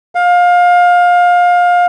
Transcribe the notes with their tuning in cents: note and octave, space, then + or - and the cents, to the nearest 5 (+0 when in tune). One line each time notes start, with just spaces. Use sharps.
F5 +25